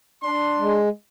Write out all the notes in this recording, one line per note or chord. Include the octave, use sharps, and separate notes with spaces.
D4 C6
G#3